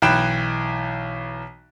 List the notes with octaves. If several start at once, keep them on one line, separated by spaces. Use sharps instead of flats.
B1 E3 G5 B5 F#6 E7